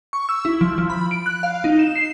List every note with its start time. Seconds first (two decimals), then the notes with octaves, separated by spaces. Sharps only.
0.13 C#6
0.29 E6
0.45 E4
0.61 F3
0.78 F3
0.90 B5
1.11 D7
1.26 F#6
1.43 F5
1.64 D#4
1.79 E7
1.96 C7